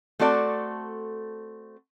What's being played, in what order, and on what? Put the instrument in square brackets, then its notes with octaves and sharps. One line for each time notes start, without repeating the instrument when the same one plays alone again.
[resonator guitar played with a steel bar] A3 C4 F#4 A4 D5